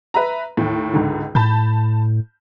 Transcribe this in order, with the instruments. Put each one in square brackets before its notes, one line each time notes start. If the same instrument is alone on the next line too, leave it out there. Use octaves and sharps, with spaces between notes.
[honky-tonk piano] B4 E5 A#5
D#2 A2
C#2 G#2 D3
[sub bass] A2 [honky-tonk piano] A5 B5 G6